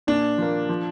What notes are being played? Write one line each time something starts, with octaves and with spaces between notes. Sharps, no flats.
A#2 D4
F3 A#3
F3